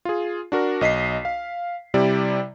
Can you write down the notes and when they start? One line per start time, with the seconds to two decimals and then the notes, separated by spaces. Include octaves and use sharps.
0.05 F4 G#4
0.52 D4 F#4 A#4
0.81 B1 D#5 B6 C7
1.25 F5
1.94 C3 G3 E4 D5